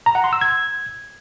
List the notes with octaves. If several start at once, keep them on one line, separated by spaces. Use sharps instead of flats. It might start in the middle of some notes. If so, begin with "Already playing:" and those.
A#5
F#5
C6
E6
G#6